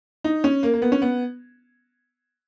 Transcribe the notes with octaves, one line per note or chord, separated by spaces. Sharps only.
D#4
C#4
A#3
A#3
B3
C#4
B3